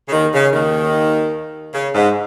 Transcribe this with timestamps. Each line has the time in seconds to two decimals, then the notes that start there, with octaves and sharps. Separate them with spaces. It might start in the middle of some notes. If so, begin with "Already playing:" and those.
0.08 C#3
0.12 D#2 D#3
0.33 C#3
0.53 D#2 D#3
1.74 C#3
1.94 G#2